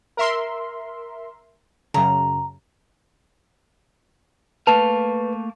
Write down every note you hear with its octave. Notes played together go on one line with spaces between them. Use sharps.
A#4 E5 C6
F#2 C#3 A#5
A3 A#3 B4 F5 A5